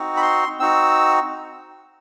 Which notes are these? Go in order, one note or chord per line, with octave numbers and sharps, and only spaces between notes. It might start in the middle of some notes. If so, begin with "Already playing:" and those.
Already playing: C4 D#4 F#4
B5
C6
C4 D#4 F#4 E6